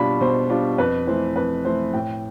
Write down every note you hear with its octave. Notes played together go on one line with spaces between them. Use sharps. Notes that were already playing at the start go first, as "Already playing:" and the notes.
Already playing: B2 G3 D4 F4 B5
B2 C5
G3 D4 F4
F2 B4
E3 A3 C5
F2 B4
E3 A3 C5
A2 G5